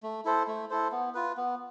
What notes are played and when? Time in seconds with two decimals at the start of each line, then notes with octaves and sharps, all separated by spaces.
0.03 A3
0.25 E4 A4 C5
0.47 A3
0.70 E4 A4 C5
0.92 B3
1.14 F4 B4
1.37 B3